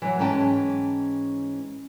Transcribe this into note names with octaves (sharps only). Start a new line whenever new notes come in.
E3 F#3
G#2 E3 C#4 G5 A5